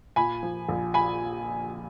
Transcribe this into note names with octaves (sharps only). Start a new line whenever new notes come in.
A#2 G#5 B5
F3
A#1
A#2 G#5 B5